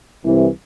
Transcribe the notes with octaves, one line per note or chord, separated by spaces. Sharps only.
C2 C3 E3